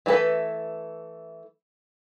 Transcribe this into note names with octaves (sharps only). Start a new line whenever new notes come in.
E3 A3 B3 A4 B4